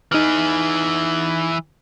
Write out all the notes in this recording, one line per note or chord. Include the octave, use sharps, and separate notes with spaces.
E3 D#4 G#4 F6